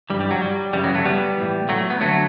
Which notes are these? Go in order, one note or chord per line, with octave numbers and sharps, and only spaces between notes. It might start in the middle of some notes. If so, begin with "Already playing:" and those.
G2 E3 G3
G3
F#3
G3
F#2 C#3 E3 G3
F#3
F#3 A3
G3 B3
A2 E3
F#3 A3
B3
D3 F#3 A3